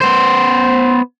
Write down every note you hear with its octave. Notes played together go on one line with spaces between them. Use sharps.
B3 C5